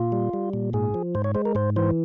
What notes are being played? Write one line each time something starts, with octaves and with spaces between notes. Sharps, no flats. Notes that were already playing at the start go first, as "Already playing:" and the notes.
Already playing: A#2 F4
G3
G3
A#2
G#2 G#4
F3
G#2 C5
C#5
G#3 C5
A#4
G#2 C5
E3 C5